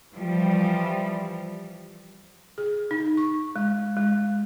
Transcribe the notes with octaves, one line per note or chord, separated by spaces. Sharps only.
E3 F3 G3
G#4
D#4
C#6
G#3
G#3